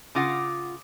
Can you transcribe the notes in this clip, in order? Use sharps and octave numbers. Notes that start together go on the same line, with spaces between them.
C#3 F4 F#5 D6 D#6 A#6